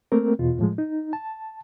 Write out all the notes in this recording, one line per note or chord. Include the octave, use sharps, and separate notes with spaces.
A3 A#3 C4 A#4
E2 B2 F4
A2 F3 G#3
D#4
A5